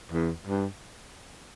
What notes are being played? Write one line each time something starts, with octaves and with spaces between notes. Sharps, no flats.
E2
G2